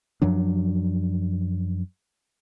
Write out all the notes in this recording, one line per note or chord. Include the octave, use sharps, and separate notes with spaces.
F#2 F3 F#3 D4